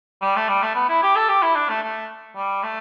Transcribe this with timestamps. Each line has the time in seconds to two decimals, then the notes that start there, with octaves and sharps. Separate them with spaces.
0.22 G3
0.36 A3
0.49 G3
0.62 A3
0.75 B3
0.89 E4
1.03 G4
1.16 A4
1.29 G4
1.42 E4
1.56 D4
1.69 A3
1.83 A3
2.36 G3
2.63 A3